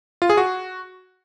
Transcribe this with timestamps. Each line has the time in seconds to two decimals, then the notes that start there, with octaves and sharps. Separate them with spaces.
0.22 F4
0.30 G#4
0.37 F#4